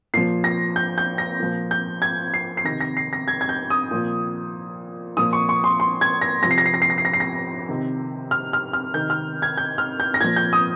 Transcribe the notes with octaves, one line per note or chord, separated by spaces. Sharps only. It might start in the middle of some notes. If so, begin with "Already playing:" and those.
A#2 F3 C7
A#6
G6
G6
A#6
A#2 F3
G6
G#6
C7
C7
C3 D#3 A#6
A#6
C7
A#6
G#6
G#6
G6
D#6
A#2 F3
A#2 F3 D#6
C#6
C#6
C6
C6
G#6
A#6
C3 F3 A#6
C7
A#6
C7
A#6
C7
A#6
C7
A#6
C7
A#6
C3 D#3
F6
F6
F6
C3 D#3 G6
F6
G#6
G6
F6
G6
A#6
A#2 F3 G#6
G6
D#6